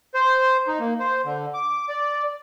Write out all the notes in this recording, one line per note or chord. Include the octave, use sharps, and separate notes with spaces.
C5
D#4
A#3
C5
D3
D6
D5